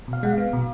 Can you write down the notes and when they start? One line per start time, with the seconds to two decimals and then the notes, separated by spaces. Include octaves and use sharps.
0.08 B2 F5
0.23 G#3 F#5
0.33 B3 F5
0.53 B2